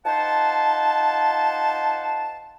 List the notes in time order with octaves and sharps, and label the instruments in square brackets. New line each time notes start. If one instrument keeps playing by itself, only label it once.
[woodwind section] D#4 F4 C5 F#5 A5